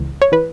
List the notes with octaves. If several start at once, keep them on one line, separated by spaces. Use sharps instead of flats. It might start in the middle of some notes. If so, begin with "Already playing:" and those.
Already playing: C#2 C#3 E3
C#5
E3 B4